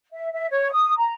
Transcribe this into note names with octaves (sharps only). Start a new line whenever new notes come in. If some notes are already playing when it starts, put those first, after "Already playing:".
E5
E5
C#5
D#6
A#5